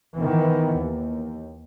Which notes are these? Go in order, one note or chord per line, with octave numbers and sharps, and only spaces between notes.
D#3 E3 B3
D#2